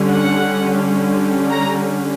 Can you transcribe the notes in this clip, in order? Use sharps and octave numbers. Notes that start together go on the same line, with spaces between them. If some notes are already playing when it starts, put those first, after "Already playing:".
Already playing: D3 G3 C#4
F#5
A#5